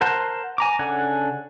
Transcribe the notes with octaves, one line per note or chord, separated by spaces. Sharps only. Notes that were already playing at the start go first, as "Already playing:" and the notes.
A#4 C5 F#5 A5 C6
G#5 A#5 D6
C#3 D4 A4 F#5 G#5